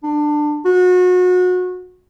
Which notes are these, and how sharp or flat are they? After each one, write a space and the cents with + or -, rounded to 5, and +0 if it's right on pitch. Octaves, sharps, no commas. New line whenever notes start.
D4 +20
F#4 -30